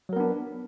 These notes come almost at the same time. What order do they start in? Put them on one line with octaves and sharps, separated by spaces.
F#3 A#4 B3 D4